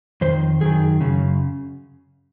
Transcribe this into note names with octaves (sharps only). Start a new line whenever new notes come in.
F2 D#3 C5
F#2 D#3 G#4
F#2 C#3